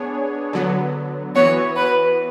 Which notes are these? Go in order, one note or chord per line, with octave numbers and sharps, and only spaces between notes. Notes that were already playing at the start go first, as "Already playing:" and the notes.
Already playing: B3 D4 G#4 C#5
D3 F#3 B3
E3 B3 F#4 C#5
B4